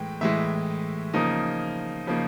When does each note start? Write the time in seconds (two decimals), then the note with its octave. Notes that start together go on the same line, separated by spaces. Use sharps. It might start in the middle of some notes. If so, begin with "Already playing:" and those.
Already playing: A2 E3 G#3 G5
0.21 A2 E3 G#3 E5
1.13 C#3 F3 A#3 D#4
2.07 C#3 F3 A#3 D#4